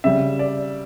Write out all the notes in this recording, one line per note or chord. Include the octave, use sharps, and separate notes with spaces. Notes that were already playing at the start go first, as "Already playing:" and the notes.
C#3 G3 E5
D5